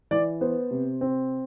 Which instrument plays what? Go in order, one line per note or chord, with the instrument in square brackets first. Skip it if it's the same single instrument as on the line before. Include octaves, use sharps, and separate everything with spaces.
[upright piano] E3 D5
B3 C5
C3
C4